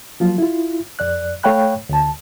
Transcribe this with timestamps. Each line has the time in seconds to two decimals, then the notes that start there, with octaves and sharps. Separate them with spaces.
0.20 F3 F#3 A#3 F4
0.38 E4 F4
0.99 F2 D5 F#6
1.43 A3 C#5 F5 G5 B5 F#6
1.89 D2 A5